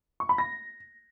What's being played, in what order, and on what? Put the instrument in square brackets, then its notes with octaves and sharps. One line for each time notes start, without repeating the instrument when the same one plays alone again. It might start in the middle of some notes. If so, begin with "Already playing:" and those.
[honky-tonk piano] C#6
B5
A#6